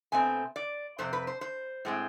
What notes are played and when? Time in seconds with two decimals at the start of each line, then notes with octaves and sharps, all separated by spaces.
0.12 B2 A3 C4 G#5
0.56 D5
0.98 F2 C3 C4 C5
1.13 B4
1.27 C5
1.41 C5
1.85 A2 G#3 C4